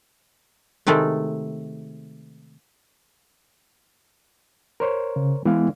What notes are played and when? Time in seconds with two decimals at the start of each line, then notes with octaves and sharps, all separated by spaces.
0.87 C3 D#3 G#3 A3
4.80 A#4 C5 C#5
5.16 C#3
5.45 E3 G#3 B3 F5